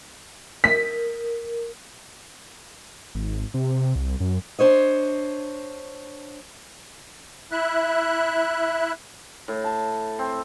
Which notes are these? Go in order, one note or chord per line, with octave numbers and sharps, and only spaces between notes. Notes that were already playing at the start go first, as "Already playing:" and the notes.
A#4 B6
G#1
C3
C2
F#2
D4 C5 C#5 D#5
E4 E5 F#6
A2
A5
C4